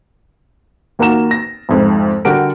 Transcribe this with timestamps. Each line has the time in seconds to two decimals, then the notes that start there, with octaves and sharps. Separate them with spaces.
0.99 D#2 A#3 F#4 A#5 E7
1.31 A#6
1.69 C2 F2 G#2
2.25 D3 G3 F#4 G4 A#4 D7